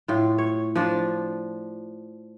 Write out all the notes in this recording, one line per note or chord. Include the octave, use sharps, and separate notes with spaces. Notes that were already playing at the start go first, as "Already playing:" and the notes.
A2 F4
C#5
F3 D4